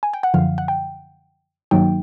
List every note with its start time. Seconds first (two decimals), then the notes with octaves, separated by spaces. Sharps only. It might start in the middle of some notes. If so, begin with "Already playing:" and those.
0.03 G#5
0.13 G5
0.23 F#5
0.34 F#2 D3 F3 F5
0.58 F#5
0.68 G5
1.71 G2 D#3 F#3 A#3 D#4 G5